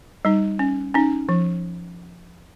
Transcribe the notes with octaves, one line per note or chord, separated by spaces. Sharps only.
G3 D#4
C#4
C#4 D#4
F3